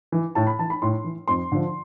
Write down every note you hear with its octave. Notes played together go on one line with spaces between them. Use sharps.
E3
A2 A5
B5
E3 A5
B5
A2 C6
E3
F2 C6
D3 F3